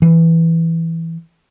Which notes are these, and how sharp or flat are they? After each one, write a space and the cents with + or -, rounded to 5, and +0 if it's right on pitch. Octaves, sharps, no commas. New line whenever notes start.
E3 +0